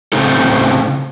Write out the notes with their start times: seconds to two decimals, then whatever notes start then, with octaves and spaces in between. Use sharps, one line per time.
0.13 A2 C#3 C4 D#4 A4